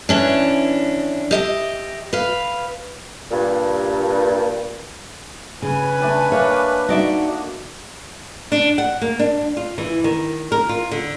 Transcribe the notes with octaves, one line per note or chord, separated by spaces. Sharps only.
E3 C#4 D4
G4 D#5 E5
B4 F5
G2 A#2
C#3 B4 G#5
A3 D4 G5
A3 A#3 C#5
D#4 F#4 D5 E5
D4
F#5
A#3
D4
F4
E3
D#3
A#4
F4
D3